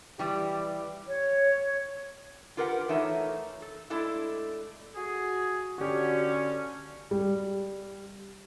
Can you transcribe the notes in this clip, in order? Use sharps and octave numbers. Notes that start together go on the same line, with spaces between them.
E3 G3 G4
C#5
F4 G4 A#4 B4 E5 F#5
E3 A3 D#4 A#4 C#5 E5
A4
G#3 A3 D4 E4 A4
F#4 G#4
D3 C#4 F#4 G4
G3